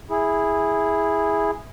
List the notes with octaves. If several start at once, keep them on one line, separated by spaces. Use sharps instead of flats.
E4 G#4